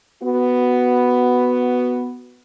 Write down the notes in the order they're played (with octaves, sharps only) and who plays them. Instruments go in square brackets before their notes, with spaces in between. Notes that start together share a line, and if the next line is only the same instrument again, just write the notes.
[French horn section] B3 F#4